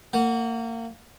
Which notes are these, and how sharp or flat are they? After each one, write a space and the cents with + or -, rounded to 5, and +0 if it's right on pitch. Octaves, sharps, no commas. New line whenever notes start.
A#3 -30 F#5 +0